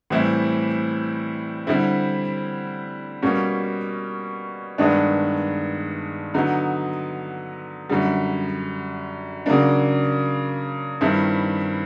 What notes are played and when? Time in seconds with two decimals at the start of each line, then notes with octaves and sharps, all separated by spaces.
0.10 A2 E3 G3 C4 E4
1.67 D3 G3 C4 E4
3.22 B2 G3 A#3 C#4
4.78 G2 D#3 G#3 B3 D4
6.34 D3 F#3 B3 D#4
7.89 F#2 D3 G3
9.46 C#3 F#3 A#3 D4
11.01 G2 D#3 G3 C4 E4